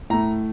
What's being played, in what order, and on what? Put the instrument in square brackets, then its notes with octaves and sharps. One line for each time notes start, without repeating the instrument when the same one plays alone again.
[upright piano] A2 A3 A#5